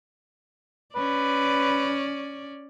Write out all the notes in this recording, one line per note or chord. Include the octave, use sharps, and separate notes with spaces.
C#4 B4 D5